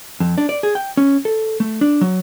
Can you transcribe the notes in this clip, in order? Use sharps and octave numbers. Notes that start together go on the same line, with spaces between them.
F2
D4
D5
G#4
G5
C#4
A4
A3
D4
F#3